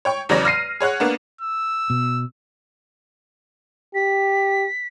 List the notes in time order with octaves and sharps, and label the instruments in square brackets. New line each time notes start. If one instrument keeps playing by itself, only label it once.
[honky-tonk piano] C#5 G5 C#6
E2 C#3 F#3 C#5 D5 A#6
F6 A#6 C7 D#7
G#4 C#5 F#5 F#6
A#3 B3 D4
[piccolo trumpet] E6
[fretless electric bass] B2
[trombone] G4 [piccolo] B6